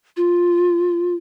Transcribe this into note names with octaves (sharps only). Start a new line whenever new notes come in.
F4